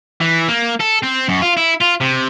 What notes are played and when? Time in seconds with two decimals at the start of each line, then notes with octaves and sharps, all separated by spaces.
0.20 E3
0.48 A#3
0.80 A4
1.03 C4
1.29 F#2
1.42 F4
1.57 E4
1.80 F4
2.00 C3